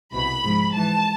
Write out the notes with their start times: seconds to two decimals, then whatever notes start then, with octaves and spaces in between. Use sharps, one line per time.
0.13 C2 B2 B5
0.43 G#2 F3
0.73 G#2 E3 A5